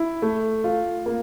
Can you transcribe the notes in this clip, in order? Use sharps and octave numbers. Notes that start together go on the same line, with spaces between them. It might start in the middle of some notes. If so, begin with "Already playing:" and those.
Already playing: E4
A3
F4
A#3